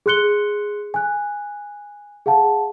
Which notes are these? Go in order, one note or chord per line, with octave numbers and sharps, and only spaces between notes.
G#4 C6 F#6 C#7 G7
G#5 F#6
G#4 F5 F#5 A5